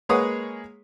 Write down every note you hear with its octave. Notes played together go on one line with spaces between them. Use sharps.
G#3 A#3 G#4 B4 C#5 D#6